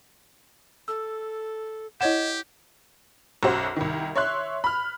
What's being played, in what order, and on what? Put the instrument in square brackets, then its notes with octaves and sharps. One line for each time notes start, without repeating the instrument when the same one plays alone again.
[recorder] A4 [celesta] E6
[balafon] E4 C#5 F#5 [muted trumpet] G4 [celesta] D#5 G#6 E7
[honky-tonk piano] B1 F#2 F#4 C5
C2 D#3
C#5 E5 C6 F#6
B5 F6